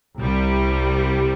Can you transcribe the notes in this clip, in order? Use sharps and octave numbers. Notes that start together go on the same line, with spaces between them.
C2 C3 G3